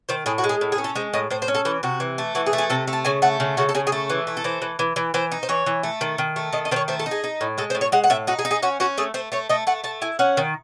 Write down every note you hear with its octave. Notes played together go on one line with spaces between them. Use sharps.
D#3 C5
A2 G#4
F#4
G#3
G#4
A2
G#4
C#4
A4
G#3 C5
A2 D#5
A2 C5
C5
C#4
A4
E3 A4
C3 F#4
E3
A3
E3 F#4
G#4
A3
G#4
C3 A4
A3
A5
C#3 G#5
A3 F#5
C#3
C#3 F#4
A4
C#3 G#4
G#4
A3 A4
E3
A3
A4
E3 C5
E3
E3
E3
E3 C5
D#4
C5
E3 C#5
E3
A3
D#3
D#3
A3
D#3 D#5
D#5
D#3 C5 C#5
A3 C5
A4
D#4
G#4
D#4
A2
G#3 A4
C5
A2
C#5
G#3 F#5
F#5
A2 E5
D#4 F#4
G#4
D#4
G#4
C#4 F#4
C#4 F#4
A3 G#4
A3 C5
A3 C#5
A3 D#5
A3 F#5
A3 A5
E4 G#5
C#4 F#5
D#3